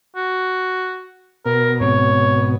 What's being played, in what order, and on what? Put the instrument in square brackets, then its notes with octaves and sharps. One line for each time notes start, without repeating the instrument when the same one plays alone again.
[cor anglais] F#4
[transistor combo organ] B2 [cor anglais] A#4
[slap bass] G#2 C4 [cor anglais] C#5